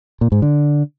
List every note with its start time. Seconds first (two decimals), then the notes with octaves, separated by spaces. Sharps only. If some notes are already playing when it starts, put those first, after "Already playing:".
0.21 A#2
0.32 G#2
0.42 D3